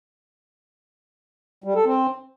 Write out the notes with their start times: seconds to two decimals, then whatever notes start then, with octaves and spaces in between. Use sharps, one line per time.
1.64 G3
1.75 A4
1.85 C4